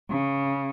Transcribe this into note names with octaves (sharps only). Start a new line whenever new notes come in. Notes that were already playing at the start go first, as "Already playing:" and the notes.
C#3